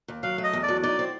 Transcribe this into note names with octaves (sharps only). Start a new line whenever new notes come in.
D#2
F#3 F5
A3
D#5
E2
D5
F#3
D#4 D5
C4